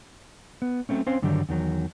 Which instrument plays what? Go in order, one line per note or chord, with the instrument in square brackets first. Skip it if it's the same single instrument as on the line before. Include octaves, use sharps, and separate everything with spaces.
[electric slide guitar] B3
F#3 A3 C4 C#4
C4 C#4 C5 F5
G2 D3 D#3 F#3 G3
E2 D#3 F#3